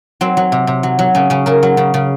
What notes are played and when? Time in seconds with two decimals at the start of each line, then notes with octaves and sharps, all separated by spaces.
0.21 F#3 C4
0.37 F#3
0.52 C3
0.67 C3
0.83 F#3
0.99 F#3
1.15 C#3 C#4
1.30 C#3 C#4
1.46 C#3 A#4
1.63 F#3
1.77 C#3
1.94 C#3